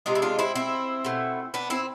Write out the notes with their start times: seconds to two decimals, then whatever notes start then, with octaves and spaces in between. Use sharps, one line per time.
0.06 C3 G#3 D4 F4
0.15 E4
0.22 D4 F4
0.39 C4 E4
0.55 C4 E4
1.05 B2 A3
1.54 B3 D4
1.70 C4 E4